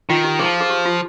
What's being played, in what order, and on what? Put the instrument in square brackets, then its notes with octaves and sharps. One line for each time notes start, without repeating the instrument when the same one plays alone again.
[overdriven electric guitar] D#3 [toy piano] F4
[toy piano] G4
[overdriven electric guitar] F3 [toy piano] G#4
[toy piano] G#4
G4
F4